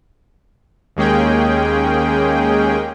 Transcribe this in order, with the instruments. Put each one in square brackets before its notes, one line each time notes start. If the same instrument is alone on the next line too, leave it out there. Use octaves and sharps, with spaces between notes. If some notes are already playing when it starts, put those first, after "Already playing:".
[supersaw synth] D#2 G#3 A#3 C#4 G#4 G5